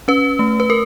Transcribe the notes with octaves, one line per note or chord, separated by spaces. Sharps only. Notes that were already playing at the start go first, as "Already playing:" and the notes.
C#4 B4
A3
B4
A#4